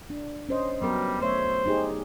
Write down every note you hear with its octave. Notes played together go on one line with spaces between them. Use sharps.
D4
C#4 C5 D#5
F#3 G3 B3 A#4
A3 C5 C#5 E5
D#4 G4 G#4